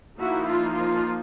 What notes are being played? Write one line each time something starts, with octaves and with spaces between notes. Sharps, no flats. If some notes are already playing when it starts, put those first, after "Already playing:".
F3 A#3 D#4 E4 F#4
F4
F4